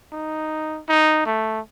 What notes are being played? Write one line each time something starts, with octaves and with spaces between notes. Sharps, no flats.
D#4
D#4
A3